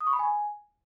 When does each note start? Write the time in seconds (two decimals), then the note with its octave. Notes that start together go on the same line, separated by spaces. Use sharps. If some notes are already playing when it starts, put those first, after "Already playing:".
0.01 D#6
0.07 C#6
0.13 B5
0.19 G#5